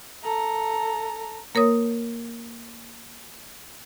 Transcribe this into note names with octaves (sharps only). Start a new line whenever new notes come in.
A4 A#5
A#3 A#4 C#5 D#6